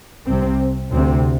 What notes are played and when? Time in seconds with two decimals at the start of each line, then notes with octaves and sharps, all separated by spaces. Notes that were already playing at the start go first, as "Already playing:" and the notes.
0.26 C2 C3 C4
0.91 D2 C3 C4